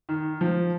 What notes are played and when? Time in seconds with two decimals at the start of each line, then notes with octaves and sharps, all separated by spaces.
0.09 D#3
0.41 F3